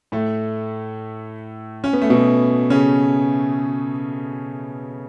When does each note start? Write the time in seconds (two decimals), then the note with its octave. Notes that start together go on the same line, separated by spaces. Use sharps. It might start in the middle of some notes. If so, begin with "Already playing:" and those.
0.12 A2 A3
1.84 C#4
1.93 B3
2.02 A3
2.10 B2 B3
2.70 C#3 C#4